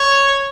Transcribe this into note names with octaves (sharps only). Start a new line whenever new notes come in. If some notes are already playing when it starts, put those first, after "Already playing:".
Already playing: C#5